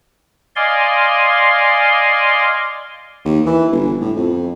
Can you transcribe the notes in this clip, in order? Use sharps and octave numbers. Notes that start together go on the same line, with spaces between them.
D5 D#5 F5 G#5 C6
D#2
E3
G1
A2
F2